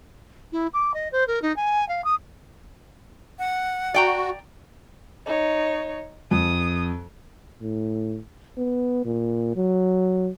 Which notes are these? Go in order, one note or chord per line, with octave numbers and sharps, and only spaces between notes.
E4
D6
D#5
C5
A#4
D#4
G#5
F5
D#6
F#5
F#4 D5 G5 A#5
D#4 C#5
F2 D#6
A2
B3
A#2
F#3